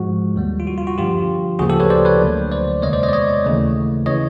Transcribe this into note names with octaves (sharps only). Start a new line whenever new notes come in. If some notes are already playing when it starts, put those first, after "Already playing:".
Already playing: G#2 F3 G#3 F#4
D#2 D#3 G3 A#3
F4
F#4
F4
F#4
G2 D3 F3 F4 G4
D2 C#3 F3 A#3 F#4 G#4
G4 A4
B4 C#5
C5 D5
B4 C#5
D2 D3 F#3 A#3
C5 D5
E2 C3 D#3 G#3 B3 C#5 D#5
C5 D5
C#5 D#5
D5
C#5 D#5
D#2 C#3 E3 A3
C#3 E3 C#5 D#5